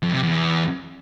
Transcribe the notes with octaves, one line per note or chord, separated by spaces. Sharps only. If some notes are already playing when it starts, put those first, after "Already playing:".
F2
C3
E2